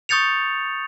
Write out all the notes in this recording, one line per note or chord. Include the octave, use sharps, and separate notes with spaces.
C#6 D#6 G6 A6 C#7 F7